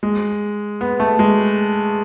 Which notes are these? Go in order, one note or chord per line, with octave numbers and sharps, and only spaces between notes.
G#3
B3
A3
G#3